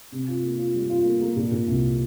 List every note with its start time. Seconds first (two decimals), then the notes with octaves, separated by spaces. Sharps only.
0.12 C3
0.27 F4
0.43 A#3
0.58 F4
0.74 G3
0.89 F4
1.05 A#3
1.21 A#3
1.36 A#2
1.51 A#2
1.68 C2